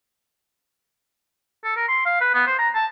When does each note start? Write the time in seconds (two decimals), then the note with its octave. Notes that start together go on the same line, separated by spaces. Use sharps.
1.64 A4
1.76 A#4
1.88 C6
2.05 F5
2.21 B4
2.34 B3
2.47 C5
2.58 A#5
2.75 A5